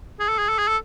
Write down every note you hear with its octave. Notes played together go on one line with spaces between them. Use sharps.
G#4
A4
G#4
A4
G#4
A4